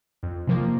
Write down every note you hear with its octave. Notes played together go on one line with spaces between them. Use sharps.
F2
C3 F3 A#3